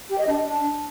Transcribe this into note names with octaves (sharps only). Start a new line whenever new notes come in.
G4
D#5
D4